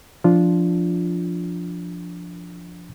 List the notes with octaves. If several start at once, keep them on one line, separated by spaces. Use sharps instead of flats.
F3 D4 F4